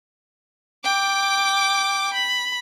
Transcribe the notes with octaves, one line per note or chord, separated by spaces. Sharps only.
G5 D6
B5